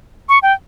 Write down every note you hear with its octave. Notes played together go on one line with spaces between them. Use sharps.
C#6
G5